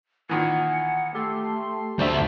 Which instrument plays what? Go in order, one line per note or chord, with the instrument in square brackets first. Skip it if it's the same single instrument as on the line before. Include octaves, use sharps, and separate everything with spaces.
[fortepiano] A#2 D#3 E3 [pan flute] F#5 [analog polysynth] G#5
[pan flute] A3 [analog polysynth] G4 A4 C6
[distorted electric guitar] D2 A5 [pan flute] D4 [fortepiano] C5 D5 E5